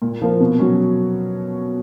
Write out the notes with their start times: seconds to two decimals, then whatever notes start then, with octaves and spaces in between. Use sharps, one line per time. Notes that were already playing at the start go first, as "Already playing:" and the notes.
0.02 A#2
0.22 F3 A#3
0.40 B2
0.59 F#3 C#4